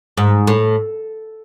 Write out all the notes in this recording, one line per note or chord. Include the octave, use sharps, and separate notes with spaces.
G#2
A2